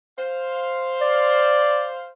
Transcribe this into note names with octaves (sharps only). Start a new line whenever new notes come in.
C5 F5
D5